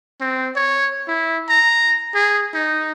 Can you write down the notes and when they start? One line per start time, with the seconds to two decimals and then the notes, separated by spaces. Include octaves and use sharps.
0.21 C4
0.56 C#5
1.08 E4
1.49 A#5
2.15 G#4
2.54 D#4